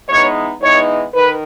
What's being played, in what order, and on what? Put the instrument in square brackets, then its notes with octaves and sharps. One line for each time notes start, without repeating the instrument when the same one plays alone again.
[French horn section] E3 G#3 B3 D#4 C#5
E3 G#3 B3 D#4 C#5
D#3 B4